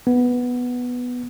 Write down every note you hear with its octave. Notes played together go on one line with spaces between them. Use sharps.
B3